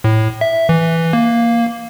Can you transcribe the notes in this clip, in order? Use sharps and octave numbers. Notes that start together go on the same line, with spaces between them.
A2
E5
E3
A#3